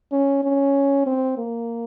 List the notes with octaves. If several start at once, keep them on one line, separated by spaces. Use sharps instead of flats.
C#4
C#4
C4
A#3